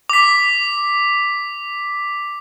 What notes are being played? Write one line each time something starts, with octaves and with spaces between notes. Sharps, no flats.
D6 B6